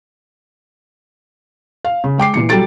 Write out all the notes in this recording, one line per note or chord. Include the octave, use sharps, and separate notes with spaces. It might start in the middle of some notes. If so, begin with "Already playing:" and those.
F5
C#3
G#3 G5 D6 C7
A#2 E3 C#7
F#3 G3 G4 A4 A6 D7